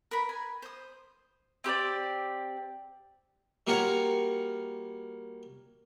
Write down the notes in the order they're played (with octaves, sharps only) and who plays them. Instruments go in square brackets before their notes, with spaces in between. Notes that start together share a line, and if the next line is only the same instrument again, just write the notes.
[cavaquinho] A#4 B4 B5
G#5
C5 D#6
[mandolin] C4 G4 A#4 D5
[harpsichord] G3 A#3 F4 F#4 A#4 C#5